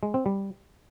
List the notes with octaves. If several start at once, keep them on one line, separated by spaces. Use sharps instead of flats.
G#3
C4
G3